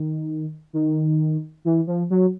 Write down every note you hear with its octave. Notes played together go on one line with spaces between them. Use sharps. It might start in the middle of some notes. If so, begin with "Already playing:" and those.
Already playing: D#3
D#3
E3
F3
F#3